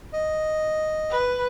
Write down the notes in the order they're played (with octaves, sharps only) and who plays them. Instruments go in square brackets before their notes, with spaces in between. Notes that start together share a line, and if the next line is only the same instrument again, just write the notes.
[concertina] D#5
[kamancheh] B4